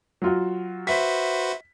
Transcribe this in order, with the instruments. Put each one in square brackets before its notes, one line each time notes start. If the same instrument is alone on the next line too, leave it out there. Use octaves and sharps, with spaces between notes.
[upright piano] F#3 F4 F#4
[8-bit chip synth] F#4 B4 C5 [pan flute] E5 [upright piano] B6